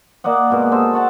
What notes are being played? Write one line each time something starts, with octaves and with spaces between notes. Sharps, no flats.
A#3 D5 D#5 F#5
B2 G#3 A#3
A4 C5 D#5
F#4 F#5 A5